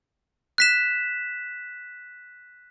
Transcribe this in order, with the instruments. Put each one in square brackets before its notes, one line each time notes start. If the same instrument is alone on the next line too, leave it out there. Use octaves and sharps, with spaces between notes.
[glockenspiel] F#6 B6 E7